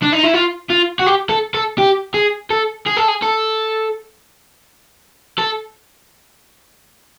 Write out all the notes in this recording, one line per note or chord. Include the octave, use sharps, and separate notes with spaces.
D4
D#4
E4
F4
F4
F#4
G4
A4
A4
G4
G#4
A4
G#4
A4
G#4
A4
A4